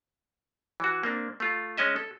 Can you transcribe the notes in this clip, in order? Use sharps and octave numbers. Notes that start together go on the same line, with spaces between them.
E3 F#4
A#3 C4 D4
A3 F4
G#3 C#4 D#5 E5
A4